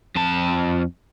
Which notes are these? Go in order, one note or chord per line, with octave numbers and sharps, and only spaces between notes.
F2 A5